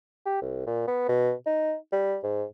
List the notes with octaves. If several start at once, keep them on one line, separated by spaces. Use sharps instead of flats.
G4
C2
A#2
B3
B2
D#4
G3
G#2